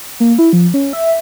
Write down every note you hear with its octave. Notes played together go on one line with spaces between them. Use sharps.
A#3
E4
F3
C#4
E5